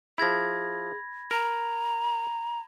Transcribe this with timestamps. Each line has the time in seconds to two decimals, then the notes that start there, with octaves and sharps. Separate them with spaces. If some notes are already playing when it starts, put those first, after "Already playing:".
0.18 F3 E4 G#4 B5 G#6 A#6
1.31 A#4 A#5